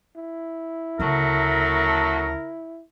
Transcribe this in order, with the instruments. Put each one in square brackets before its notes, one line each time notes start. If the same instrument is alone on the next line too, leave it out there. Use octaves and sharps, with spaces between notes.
[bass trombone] E4
[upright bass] D2 C#3 [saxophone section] F#3 A3 [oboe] A#4